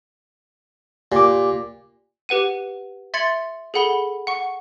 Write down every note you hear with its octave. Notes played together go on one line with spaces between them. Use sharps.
A#2 G4 D6
G4 B4 F#5 D#7
E5 C6 G#6 A6 C#7 F#7
G#4 A4 F#5 B5 G7
F#5 C#6